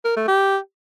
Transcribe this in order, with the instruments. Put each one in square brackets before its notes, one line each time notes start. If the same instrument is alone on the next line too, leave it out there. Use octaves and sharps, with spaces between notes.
[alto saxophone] A#4
A3
G4